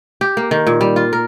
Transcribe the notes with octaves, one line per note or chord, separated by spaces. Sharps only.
G4
A#3
D#3
A#2
G3
F4
A#4